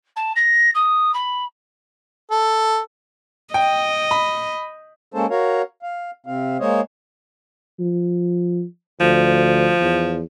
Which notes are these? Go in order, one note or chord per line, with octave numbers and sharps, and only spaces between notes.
A5
A#6
D#6
B5
A4
D#5 G5
B5
G#3 A#3 C#4 A4 C5 A5
F#4 A#4 C#5 F5
F5
C3 C4 F5
G#3 A#3 C5 C#5 D#5
F3
D2 F3
E2